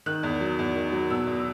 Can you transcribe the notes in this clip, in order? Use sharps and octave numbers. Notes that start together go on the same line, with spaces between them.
D#3 F#6
E2
F#3
E2
D#3
F#3
B2 E6
E2